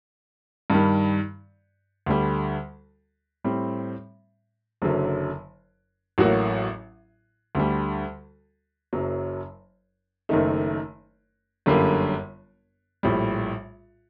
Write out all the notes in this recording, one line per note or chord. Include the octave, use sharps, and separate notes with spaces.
G2 D#3 G3
D2 D3 G3
A2 G3 C4
F#1 F#2 D3 F#3
A1 A2 F#3 A#3 F#4
D2 D3 G3
F#1 F#2 F#3
F#1 F#2 D#3 A3 D#4
G1 F#2 D3 G3 A#3
A#1 A2 G3